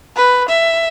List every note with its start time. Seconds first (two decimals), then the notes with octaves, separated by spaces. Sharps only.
0.16 B4
0.48 E5